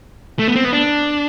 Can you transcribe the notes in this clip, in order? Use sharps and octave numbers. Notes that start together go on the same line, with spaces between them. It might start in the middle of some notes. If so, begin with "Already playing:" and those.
A3
B3
C4
B3
D4